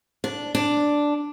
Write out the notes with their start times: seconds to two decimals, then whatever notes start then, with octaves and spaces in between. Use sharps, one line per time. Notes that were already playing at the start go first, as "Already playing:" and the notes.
0.24 D4
0.55 D4